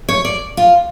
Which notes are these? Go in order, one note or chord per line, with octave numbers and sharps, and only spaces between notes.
C#5
D5
F4